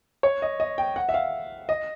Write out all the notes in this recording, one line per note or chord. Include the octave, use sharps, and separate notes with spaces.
C#5
D#5
D#5
G5
F#5
E5
F5
D#5